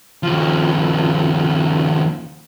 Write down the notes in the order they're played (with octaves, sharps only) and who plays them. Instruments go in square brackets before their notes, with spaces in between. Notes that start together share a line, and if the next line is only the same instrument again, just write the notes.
[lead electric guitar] D#2 F3